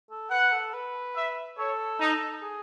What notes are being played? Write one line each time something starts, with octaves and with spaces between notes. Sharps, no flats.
A4
B4 F#5
A4
B4
E5
A4 C#5
D#4
G#4